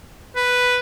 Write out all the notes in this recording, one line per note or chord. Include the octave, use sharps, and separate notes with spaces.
B4